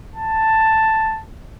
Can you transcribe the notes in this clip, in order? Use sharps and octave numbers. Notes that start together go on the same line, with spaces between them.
A5